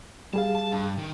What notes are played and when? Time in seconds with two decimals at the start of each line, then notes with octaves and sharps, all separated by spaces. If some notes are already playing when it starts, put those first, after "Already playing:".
0.33 G3 G#4 F5 A5
0.55 A5
0.72 G2
0.98 D#3